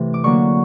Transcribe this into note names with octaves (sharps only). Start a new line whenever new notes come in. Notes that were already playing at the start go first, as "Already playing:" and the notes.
Already playing: C3 E3 A3
D6
D3 F#3 A#3 C#6